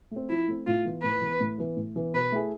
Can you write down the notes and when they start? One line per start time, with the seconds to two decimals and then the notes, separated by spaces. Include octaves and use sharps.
0.11 A3 C4
0.30 F3 E4
0.48 A3 C4
0.67 A2 F4
0.85 E3 B3
1.03 A2 B4
1.22 E3 B3
1.41 A2
1.58 E3 B3
1.77 A2
1.96 E3 B3
2.14 B2 B4
2.32 A3 E4 G#4